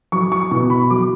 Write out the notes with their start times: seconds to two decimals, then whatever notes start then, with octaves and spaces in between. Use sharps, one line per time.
0.12 F#3 C#6
0.32 C#6
0.51 B2 C#6
0.70 B5
0.90 F#3 D6